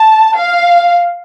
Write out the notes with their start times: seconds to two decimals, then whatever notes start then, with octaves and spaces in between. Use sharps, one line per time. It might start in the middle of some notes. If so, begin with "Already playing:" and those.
Already playing: A5
0.37 F5